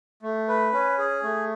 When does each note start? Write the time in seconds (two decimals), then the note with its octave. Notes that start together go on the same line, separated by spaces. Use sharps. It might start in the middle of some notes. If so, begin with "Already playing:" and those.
0.23 A3
0.48 B4
0.73 C#4
0.98 G#4
1.23 A3